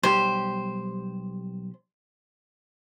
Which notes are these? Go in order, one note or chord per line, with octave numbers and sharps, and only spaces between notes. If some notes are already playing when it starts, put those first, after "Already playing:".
B1 G3 G4 C5